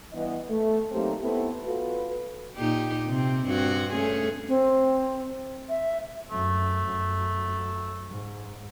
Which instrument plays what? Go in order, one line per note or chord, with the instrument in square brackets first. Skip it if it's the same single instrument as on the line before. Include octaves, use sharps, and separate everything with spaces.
[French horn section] G2 E3 B3 D#5
A3
F#3 A3 A#3 C4 D#4 G4
A3 B3 C4 E4 A4
F4 F#4 A4 B4
[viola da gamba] A#2 D#4 G4
C3 C4
G2 C4 F#4
A3 C#4 G#4
[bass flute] C4
E5
[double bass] F#2 [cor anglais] A3
[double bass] F#2 F#3
G#2